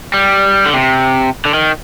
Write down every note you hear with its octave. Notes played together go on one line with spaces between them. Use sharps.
G3
D3
C3
D3
D#3